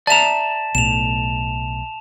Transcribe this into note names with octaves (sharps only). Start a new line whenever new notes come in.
D5 E5 A5 A#5 E7
B1 A2 E7 F7